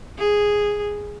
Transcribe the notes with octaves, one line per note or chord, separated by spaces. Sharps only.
G#4